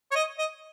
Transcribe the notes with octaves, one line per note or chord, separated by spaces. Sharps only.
C#5
D#5
D#5